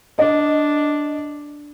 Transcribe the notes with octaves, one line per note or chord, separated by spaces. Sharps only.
D4 D#5